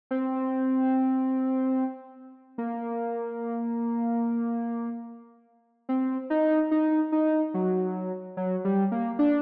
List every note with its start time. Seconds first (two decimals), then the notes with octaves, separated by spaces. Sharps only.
0.11 C4
2.58 A#3
5.89 C4
6.30 D#4
6.71 D#4
7.12 D#4
7.54 F#3
8.37 F#3
8.65 G3
8.92 A#3
9.19 D4